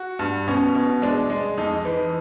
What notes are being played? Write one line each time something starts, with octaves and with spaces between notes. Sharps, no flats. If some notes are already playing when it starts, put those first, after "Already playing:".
Already playing: F#4
G2
B2 C#4
B2
G#3 D4
G#3
F2 D#4
E3